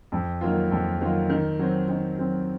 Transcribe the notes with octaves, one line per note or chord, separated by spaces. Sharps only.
F2
D#3 F#3 A#3 F4
F2
D#3 F#3 A#3 F4
D#3
F#3 C4
D#3
F#3 C4